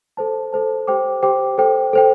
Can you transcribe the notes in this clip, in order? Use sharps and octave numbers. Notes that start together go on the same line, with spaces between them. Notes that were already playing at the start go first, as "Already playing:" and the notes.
A4 C5 A5
A4 C5 A5
G4 C5 G5 D6
G4 C5 G5 D6
A4 C5 G5
A4 C5 G5